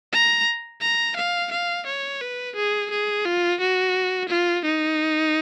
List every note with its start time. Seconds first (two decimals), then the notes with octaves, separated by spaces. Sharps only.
0.12 A#5
0.81 A#5
1.16 F5
1.52 F5
1.86 C#5
2.21 B4
2.56 G#4
2.91 G#4
3.25 F4
3.60 F#4
4.29 F4
4.65 D#4